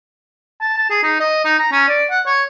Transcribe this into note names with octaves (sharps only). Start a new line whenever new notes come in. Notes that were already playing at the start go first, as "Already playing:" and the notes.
A5
A5
G#4
D#4
D#5
D#4
A#5
C#4
D5
F#5
C#5